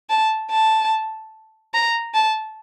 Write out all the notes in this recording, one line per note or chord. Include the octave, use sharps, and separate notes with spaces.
A5
A5
A#5
A5